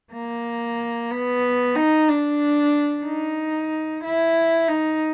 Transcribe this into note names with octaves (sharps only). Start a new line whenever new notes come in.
A#3
B3
D#4
D4
D#4
E4
D#4